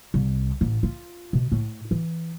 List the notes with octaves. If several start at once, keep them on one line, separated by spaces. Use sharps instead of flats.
C2
A1
F4
B2
A2
E3